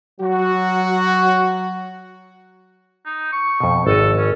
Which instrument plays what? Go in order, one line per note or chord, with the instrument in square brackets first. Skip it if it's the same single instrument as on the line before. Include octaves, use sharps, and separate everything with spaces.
[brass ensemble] F#3 F#4
[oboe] D#4
C#6
[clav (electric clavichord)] F2 B2
[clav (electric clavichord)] G#1 D#5 [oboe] A4
[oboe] C#4